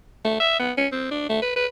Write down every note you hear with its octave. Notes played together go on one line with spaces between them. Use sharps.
A3
E5
B3
C#4
C4
D4
A3
B4
B4